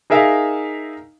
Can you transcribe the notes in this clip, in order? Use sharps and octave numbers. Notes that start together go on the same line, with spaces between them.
D#4 G#4 A#4 E5 F5